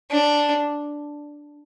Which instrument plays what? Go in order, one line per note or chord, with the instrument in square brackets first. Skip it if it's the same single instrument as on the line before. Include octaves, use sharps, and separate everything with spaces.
[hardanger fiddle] D4